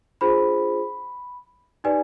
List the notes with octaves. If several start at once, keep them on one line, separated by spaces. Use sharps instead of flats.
D4 F4 G#4 C5 B5
D#4 G4 B4 D5 G#5